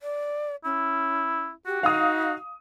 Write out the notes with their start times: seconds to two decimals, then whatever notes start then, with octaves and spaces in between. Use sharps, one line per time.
0.01 D5
0.65 C#4 E4
1.66 F#4 G4
1.83 D#4 F5 D#6